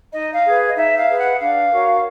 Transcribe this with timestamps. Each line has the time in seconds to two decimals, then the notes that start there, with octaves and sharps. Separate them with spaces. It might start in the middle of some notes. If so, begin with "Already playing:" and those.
0.12 D#4 D#5
0.33 F5
0.44 G#4 B4
0.67 D#5
0.76 D#4 E5
0.97 F5
1.07 G#4 B4
1.18 F#5
1.39 D4 F5
1.71 F#4 A#4 C#5